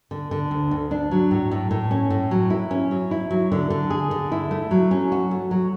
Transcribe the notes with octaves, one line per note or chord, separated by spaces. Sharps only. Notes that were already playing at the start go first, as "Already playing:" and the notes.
D3
D3
D2
D2
D4
F#3
A2
A2
A2
C#4
A2
F#3
E4
C#4
F#3
E4
F#3
D3
D3
G#4
D3
E4
A3
F#3
C#4
F#4
A3
F#3